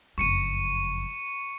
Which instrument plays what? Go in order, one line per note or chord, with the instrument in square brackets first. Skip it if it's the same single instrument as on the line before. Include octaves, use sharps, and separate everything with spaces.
[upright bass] F#1 F2 [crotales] C#6 C#7 D#7